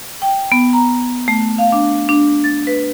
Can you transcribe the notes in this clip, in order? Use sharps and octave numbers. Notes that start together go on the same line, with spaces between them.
G5
B3
A#5
A3
F5
D4
D4
A6
B4